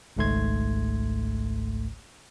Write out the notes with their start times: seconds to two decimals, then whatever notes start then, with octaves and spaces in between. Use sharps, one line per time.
0.17 G#1 C#2 G#2 A3 C6 G#6